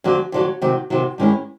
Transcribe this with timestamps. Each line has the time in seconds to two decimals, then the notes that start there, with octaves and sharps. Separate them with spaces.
0.04 F2 D3 F#3
0.32 F2 D3 F#3
0.61 C3 D#3 F#3
0.90 C3 D#3 F#3
1.18 G2 D#3 G#3 C#4 E4